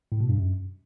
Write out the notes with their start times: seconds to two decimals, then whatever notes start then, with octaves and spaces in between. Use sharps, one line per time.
0.12 A2
0.20 B2
0.29 G2
0.38 F#2